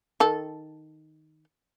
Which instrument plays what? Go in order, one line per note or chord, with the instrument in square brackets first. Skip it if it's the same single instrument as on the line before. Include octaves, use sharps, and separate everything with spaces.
[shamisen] D#3 A4